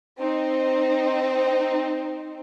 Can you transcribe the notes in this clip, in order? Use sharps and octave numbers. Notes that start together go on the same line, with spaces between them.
C4 D#4